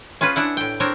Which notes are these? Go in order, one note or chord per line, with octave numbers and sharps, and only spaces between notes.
C#4 F4 G#4 B4
D4 E4 F#5
A2 G5
C4 D4 A#4 C#5